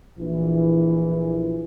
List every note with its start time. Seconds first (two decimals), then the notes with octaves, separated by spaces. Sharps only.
0.19 A#1 E3